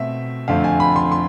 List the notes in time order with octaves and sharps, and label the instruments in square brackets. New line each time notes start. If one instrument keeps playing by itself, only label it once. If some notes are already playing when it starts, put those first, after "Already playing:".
Already playing: [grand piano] B2 A3 C4 E5
F2 D3 A3 C4 F5
G#5
B5
C6
C6